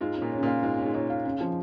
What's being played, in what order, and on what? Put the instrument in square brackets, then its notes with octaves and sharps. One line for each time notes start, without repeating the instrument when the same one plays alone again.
[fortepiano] G#2 [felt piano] F4
[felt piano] C#4
[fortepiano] A#2
[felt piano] C#5
[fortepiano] C#3
[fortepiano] A#2 [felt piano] F5
[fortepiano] G#2 [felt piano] F4
[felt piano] C#4
[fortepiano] G#2
[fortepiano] A#2 [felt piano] C#5
[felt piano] F5
[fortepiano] C#3 [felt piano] C#4
[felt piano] F3